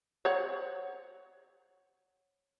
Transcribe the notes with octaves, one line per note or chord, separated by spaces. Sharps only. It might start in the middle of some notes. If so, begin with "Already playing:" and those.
C5 C#5 F#5